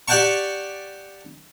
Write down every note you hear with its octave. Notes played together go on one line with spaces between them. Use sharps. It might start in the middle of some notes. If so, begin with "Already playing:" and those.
G4 D5 F#5 G5 A5 C#6